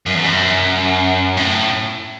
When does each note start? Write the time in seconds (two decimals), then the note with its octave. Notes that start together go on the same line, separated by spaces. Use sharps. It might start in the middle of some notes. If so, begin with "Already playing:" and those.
0.06 F#2
0.15 E2
0.24 F#2
1.37 A2